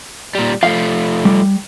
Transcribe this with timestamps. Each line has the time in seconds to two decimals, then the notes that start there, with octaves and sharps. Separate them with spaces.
0.35 A#2 G3
0.63 F3 A3 F5
1.25 G3